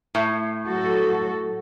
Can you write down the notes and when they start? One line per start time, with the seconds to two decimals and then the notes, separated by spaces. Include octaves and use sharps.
0.15 A2
0.68 F#3 F#4 A4